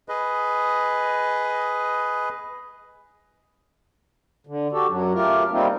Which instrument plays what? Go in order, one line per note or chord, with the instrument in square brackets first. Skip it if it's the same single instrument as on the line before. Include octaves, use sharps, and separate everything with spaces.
[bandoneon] G#4 B4 D#5
[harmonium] D3
F#4 G4 A4
F#2 F#3
A3 F4 G4 A#4
G3 A3 A#3 C4 D#4 F4